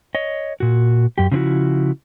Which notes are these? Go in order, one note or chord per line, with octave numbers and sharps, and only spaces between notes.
C#5 D#5
A#2 F#4
F#2 G4
C#3 F3 C4 E4 F#4